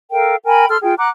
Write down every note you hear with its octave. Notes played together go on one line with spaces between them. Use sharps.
A4 A#4 F5 G5
A#4 G5 G#5 B5
A4 C6 F6
F4 G#4 G5
F#5 A#5 D6 F#6